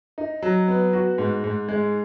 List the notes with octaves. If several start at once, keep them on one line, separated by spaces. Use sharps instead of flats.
D#4
F#3
B3
F#4
G#2
G#2
G#3